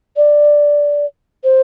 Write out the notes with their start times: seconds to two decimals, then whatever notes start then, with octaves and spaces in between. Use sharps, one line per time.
0.17 D5
1.44 C5